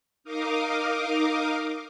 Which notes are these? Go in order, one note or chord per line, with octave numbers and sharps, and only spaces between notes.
D#4 A#4 D#5 F5 D6